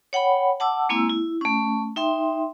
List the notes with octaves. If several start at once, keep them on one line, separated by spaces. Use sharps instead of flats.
C#5 F#5 G5 B5
F#5 A5 D6 E6
G#3 A#3 C4 E4 E6
E4
A3 C#4
D#4 E5 G5 C6